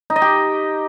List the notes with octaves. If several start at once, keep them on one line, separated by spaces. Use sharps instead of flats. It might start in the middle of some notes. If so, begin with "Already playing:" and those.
D#4
D#5
G4